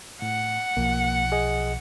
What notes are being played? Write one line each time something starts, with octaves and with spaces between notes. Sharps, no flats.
A2 F#5
B1 F3 A#3
G#4 D#5